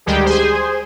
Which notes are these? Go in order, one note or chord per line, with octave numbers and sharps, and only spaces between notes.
D2 D#3 G3 G#3 G4
G#4 C5